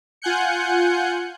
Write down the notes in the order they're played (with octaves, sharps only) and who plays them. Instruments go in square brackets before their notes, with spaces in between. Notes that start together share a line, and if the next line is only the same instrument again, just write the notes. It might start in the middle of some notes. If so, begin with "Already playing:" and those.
[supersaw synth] F4 F#5 G#5 F#6 G6 C#7